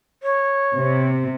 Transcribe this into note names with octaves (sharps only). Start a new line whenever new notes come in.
C#5
C3